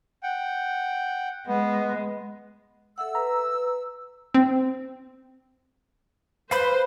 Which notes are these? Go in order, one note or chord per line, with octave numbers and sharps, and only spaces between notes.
F#5 G5
G#3 B3
A4 E5 F#5 E6
B4 A#5
C4
B4 C5 F5 B5 G6